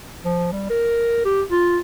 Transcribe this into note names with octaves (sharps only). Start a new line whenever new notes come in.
F3
G3
A#4
G4
F4